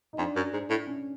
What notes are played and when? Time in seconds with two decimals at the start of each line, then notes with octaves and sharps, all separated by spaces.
0.13 D#4
0.18 F2 D4
0.36 F#2
0.53 G#2
0.70 A2
0.87 C#4